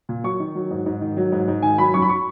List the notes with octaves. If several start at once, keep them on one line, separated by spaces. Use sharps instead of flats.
A#2
F#3 C#6
D#3
F#3
G#2
G#2
D#3
F#3
G#2
G#2
D#3 G#5
F#3 B5
F#2 C#6
B5
C#6